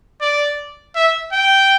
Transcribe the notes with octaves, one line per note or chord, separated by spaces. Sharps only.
D5
E5
G5